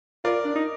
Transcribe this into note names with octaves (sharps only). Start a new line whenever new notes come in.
F4 A#4 D5
D4
D#4